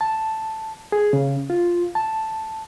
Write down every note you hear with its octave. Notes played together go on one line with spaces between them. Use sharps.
A5
G#4
C#3
F4
A5